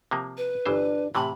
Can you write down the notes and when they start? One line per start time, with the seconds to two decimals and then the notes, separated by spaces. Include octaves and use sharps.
0.11 C3 F3 A#3
0.37 B4
0.66 G1 E3 D4 C5
1.15 A2 C3 E3 G4 B5